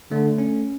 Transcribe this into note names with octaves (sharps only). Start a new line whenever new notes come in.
D3 A3
C#4